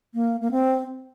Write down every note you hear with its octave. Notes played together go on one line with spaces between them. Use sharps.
A#3
A#3
C4